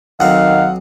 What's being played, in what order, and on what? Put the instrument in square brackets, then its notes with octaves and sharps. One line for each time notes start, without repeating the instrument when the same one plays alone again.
[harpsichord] B1 C4 [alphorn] D#3 [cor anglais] F5 [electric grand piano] F#5